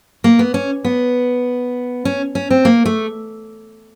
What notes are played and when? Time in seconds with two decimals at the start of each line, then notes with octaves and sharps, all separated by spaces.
0.24 A#3
0.39 B3
0.54 C#4
0.84 B3
2.05 C#4
2.35 C#4
2.50 C4
2.65 A#3
2.85 A3